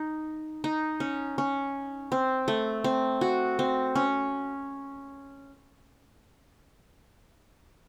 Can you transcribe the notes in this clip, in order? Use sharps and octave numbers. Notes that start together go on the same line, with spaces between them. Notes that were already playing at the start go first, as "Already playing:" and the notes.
Already playing: D#4
D#4
C#4
C#4
C4
A3
C4
F#4
C4
C#4